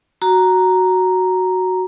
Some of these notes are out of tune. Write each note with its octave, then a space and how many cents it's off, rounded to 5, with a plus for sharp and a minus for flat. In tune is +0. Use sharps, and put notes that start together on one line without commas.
F#4 +0 A#5 +0